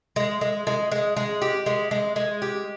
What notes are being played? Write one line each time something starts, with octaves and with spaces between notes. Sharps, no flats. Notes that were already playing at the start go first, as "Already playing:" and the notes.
G#3
G#3
G#3
G#3
G#3
G4
G#3
G#3
G#3
G4